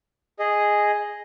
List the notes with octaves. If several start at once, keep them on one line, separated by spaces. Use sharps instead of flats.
G#4 D#5